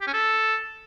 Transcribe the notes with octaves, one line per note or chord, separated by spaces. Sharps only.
G4
C#4
A4